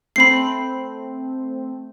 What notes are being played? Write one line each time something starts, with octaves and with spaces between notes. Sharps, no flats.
A3 C4 B5 C7